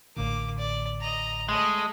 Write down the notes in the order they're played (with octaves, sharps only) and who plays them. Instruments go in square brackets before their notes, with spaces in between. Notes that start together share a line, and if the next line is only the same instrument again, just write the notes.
[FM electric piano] A1 A2 D3 [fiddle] A#3 D6
[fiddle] D5
D#5 A#5
[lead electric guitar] G#3 [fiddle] A3 D#5